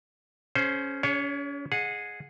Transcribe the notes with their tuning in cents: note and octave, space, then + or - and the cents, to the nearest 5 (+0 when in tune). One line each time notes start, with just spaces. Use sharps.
C#4 +0 G#4 +35 C5 +0
C#4 +40 G#4 -5 C#5 +0
G#4 +0 D#5 -15 F#5 -30